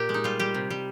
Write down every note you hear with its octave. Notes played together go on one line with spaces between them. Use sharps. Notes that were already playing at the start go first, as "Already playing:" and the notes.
Already playing: A#2 G4 A#4
G#3
D#4
G3 F4
G3 G4
C3
G3